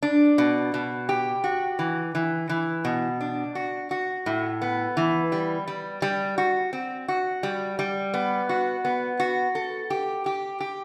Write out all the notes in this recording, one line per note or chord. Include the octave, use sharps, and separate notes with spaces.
D4
B2
B2
G4
F#4
E3
E3
E3
B2
D4
F#4
F#4
A2
B3
E3
G3
G3
G3
F#4
C4
F#4
G3
G3
B3
F#4
B3
F#4
A4
G4
G4
G4